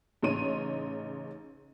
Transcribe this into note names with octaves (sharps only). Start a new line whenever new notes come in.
A1 C#3 D#4 C#5 C6 D#7